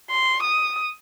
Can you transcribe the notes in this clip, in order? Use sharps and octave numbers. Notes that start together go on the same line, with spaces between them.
C6
D#6